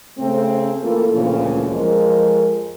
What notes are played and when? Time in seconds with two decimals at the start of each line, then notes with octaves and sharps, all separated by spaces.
0.19 C#3 A3 C4
0.82 E3 A#3 F4 A4
1.13 D2 A#2 C#3 E3 F3
1.68 F2 F3 G#3 A#4